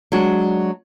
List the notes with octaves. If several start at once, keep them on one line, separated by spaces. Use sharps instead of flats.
F#3 G#3 D4 F#4